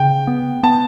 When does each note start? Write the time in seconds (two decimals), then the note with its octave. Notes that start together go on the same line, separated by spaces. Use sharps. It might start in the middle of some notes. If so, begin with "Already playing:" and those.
Already playing: C#3 G5
0.27 B3
0.63 B3 A5